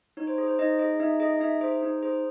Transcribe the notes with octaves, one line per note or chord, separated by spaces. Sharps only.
D#4 C#5
C5
G#4 C5
C5
D#4 D#5
G#4 D#5
D#4 E5
G#4 D#5
D#4 E5
G#4 C5
D#4
G#4 C5